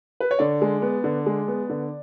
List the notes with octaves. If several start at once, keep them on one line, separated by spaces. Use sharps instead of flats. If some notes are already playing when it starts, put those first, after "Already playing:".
B4
C#5
D3 D5
G#3
B3
D3
G#3
B3
D3